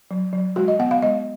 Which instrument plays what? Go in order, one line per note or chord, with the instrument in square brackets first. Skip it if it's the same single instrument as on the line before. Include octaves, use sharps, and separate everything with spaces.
[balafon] F#3
F#3
G#3 F#4
D#5
B3 F#5
F5
G#3 D#5